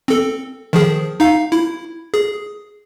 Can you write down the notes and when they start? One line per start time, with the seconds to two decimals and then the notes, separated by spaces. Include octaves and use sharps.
0.08 C4 A4
0.73 D#3 F3 G#4
1.20 D#4 F5
1.52 E4
2.14 G#4